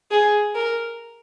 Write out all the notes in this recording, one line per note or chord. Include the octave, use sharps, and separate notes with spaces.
G#4
A#4